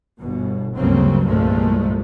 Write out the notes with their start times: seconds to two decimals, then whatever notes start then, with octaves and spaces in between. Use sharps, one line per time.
0.20 G1 B2
0.76 D2 G2 C#3 F#3 A#3 C4
1.25 C2 G2 A#2 F3 G#3 A3